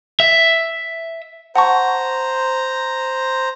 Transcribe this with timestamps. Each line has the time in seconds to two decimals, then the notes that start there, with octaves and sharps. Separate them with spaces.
0.20 E5
1.55 C5 F#5 A5 A#5 C#6